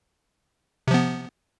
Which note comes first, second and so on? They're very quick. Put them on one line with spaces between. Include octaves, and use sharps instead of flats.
C3 F3 B3